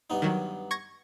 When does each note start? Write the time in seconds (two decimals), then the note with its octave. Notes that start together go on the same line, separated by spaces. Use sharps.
0.10 G2 B3 D#4
0.22 D#3 F#3
0.71 C#6 G#6 A#6